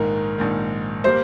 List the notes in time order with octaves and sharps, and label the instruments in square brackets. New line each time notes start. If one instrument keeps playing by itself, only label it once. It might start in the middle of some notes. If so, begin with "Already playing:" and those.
Already playing: [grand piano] A#1 G#2 D#3 [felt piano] A#4
[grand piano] A#1 G#2 D#3
[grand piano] G3 A#3 [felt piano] C5